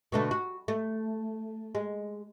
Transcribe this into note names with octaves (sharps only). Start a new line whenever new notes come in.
B2 D3 A3
F#4
A3
G#3